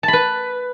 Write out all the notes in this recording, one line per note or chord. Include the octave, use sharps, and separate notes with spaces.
B4 A5 B5